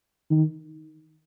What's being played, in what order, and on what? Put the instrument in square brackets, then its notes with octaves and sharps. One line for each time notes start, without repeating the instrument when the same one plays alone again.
[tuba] D#3